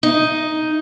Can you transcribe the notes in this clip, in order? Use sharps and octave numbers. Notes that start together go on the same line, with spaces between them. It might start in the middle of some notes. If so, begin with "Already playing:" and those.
D#4